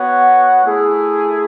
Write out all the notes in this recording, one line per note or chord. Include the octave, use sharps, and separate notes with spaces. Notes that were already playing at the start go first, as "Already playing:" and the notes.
Already playing: B3 F#4 C#5 F#5
A3 E4 G#4